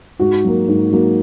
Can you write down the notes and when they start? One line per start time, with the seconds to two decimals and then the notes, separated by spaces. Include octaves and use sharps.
0.19 G#2 F#4
0.44 F#3 A#3
0.68 G#2
0.92 F#3 A#3